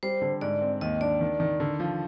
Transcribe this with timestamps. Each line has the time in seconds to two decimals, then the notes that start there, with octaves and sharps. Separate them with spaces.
0.03 G3 C5
0.22 D3
0.41 G#2 D5
0.61 C4
0.81 D#2 D#5
1.01 D4 D5
1.21 D#3
1.40 D#3
1.60 D3
1.80 F3